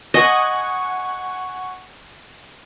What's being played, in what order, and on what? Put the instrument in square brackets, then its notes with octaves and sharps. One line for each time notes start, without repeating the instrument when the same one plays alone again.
[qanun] D#5 [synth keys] F#5 G#5 C#6